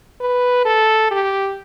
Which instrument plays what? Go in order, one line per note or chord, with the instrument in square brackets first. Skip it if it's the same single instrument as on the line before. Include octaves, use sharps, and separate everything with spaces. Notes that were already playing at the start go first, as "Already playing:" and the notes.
[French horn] B4
A4
G4